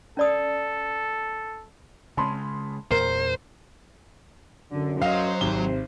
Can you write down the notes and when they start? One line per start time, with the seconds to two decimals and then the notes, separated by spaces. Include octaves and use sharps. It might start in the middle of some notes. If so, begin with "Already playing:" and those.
0.17 C#4 A4 D5 D#6
2.17 C#3 G#3 A5 B5 C6
2.91 E2 A#2 A#4 C5
4.72 F#2 D3
5.02 F#3 C5 D#5 F5
5.41 G#1 C3 G7